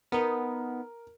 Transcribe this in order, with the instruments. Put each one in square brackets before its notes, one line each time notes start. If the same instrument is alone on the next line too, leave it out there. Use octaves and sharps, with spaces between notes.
[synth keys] B3 D#4 [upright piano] A#4